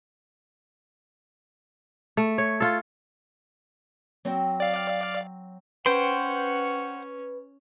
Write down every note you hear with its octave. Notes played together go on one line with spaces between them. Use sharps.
A3
C#5
F4 A4
F#3 C4 G5
D5 F5
C#4 B4 C5 F#5 G5 C6